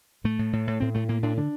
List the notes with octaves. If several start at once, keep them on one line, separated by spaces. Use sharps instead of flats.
A2 A3
A2
A2
A2
A2 C4
A2 A3
A2 A#3
A2 D4
D3 D4